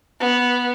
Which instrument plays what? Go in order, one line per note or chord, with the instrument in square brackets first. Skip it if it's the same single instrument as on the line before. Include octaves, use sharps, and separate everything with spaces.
[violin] B3